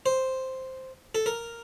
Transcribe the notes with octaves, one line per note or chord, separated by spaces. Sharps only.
C5
A4
A#4